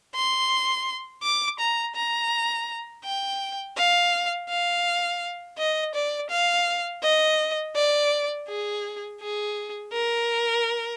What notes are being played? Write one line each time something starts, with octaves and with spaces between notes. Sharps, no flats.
C6
D6
A#5
A#5
G5
F5
F5
D#5
D5
F5
D#5
D5
G#4
G#4
A#4